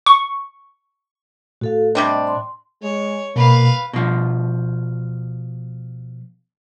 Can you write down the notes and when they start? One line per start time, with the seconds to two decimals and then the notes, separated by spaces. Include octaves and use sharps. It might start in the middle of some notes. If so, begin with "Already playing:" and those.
0.06 C#6
1.61 A2 F#4 A4 F5
1.95 C3 G3 D4 D#5
2.27 C6
2.82 G#3 C#5
3.36 B2 A#3 B4 F5
3.93 B2 F3